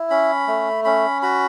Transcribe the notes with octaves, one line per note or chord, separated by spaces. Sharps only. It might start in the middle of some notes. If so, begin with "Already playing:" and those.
Already playing: E4
C#4 B5
A3
C#4 B5
F#4 B5